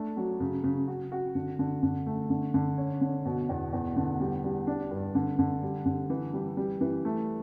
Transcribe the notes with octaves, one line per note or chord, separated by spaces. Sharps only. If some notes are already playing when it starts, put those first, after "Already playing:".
Already playing: A3 D4
F#3
C#3
C#3
F#4
F#4
D3
D3
D3
A3
D3
D3
C#4
D3
B2
E2
E2
D3
G3
G3
D4
G2
D3
D3
G3
D3
E3
G3
G3
E3
A3